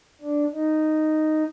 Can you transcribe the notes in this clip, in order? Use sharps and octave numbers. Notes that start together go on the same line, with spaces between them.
D4
D#4